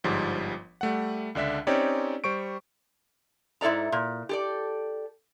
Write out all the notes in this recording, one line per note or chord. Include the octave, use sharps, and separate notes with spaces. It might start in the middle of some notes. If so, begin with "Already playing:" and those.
G1 G#2 F3 G3
G3 A3 F#5
C#2 D3 D4 E5 B6
C4 C#4 D#4 G4 C#5 D5
G3 C5 C#6 D7
G#2 E4 A4 D5 A#5
A#2
G4 A4 D5